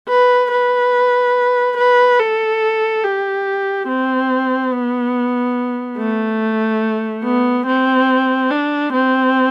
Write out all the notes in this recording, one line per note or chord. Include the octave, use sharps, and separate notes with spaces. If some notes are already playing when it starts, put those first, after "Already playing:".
B4
B4
B4
A4
G4
C4
B3
A3
B3
C4
D4
C4